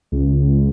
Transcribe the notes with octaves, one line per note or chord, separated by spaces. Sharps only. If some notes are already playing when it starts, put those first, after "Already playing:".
C#2